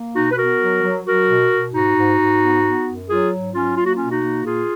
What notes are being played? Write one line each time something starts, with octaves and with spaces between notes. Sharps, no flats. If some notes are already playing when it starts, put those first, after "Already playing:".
Already playing: A#3
B2 D#4 F#4
B4
B3 F#4 A#4
F#3
F#3
F#3 F#4 A#4
B2
B2
G#2 D#4 F#4
G#2
G#2
B3
B3
F#2
F#3 F4 G#4
G#2
F#3 C#4 F4
A#3 F4
F#4
C#4 F4
B2
D#4 F#4
A#3
A#2 F4 G#4